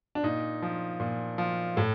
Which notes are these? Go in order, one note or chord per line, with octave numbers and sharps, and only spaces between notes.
D4
A#2 D#4
F3
A#2
F3
A2